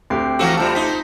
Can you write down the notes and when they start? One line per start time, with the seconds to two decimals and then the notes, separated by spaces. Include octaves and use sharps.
0.10 D2 C4 G4 G5 C7
0.39 E3 F3 F#4 A4 C#7
0.57 C3 G3 F4 C5 A5
0.75 C4 D#4 B6